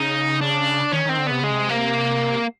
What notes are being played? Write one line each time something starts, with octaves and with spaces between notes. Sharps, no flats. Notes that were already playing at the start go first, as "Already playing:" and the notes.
Already playing: C#3 D#4
D4
D#3 C#4
D#3 C4
D3
C3 B3
C#3 G#3
C3
A#3